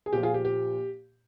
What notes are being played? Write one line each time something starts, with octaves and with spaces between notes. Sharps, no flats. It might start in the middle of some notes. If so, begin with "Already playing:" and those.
G#4
A#2 F3 G4
F4 G#4
G4
G4